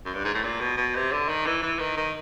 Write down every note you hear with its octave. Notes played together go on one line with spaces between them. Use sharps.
F#2
G2
G#2
A2
A#2
B2
B2
C3
D3
D#3
E3
E3
D#3
D#3